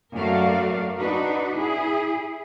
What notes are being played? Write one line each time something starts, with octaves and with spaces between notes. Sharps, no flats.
F#2 A3 F#4 A#4 D5 F5
D4 D#4 F#4 B4
E4 G#4